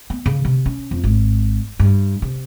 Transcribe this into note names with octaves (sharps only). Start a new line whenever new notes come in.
B3
C#3
C3
C#4
F2
G#1
G2
C3